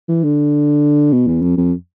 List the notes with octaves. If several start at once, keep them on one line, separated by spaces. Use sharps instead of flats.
E3
D3
B2
E2
F2
F2